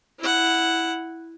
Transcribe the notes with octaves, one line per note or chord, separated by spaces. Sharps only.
E4 F#5